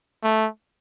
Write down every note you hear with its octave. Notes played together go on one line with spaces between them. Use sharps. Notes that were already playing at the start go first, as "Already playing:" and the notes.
A3